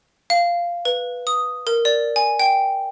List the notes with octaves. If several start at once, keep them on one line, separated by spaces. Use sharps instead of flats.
F5
B4
D#6
A#4
D5
G#5
G5